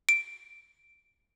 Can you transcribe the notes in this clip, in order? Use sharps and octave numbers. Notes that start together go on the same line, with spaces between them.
D7